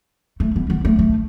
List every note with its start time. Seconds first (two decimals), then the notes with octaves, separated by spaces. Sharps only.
0.40 A3
0.56 B3
0.70 B3
0.85 A3
0.99 A3